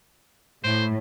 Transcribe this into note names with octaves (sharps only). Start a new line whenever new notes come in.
A2 C5